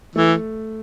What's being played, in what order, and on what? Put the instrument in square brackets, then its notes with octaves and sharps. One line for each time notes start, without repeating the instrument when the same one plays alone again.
[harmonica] E3 [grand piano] A3